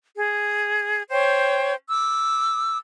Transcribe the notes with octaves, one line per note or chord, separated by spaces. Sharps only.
G#4
C5 C#5 G5
D6 E6